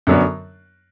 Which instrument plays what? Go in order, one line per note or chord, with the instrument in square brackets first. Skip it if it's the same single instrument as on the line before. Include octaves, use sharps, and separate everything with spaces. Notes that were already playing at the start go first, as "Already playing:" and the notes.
[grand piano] F#2 D3 F#3 B3 D4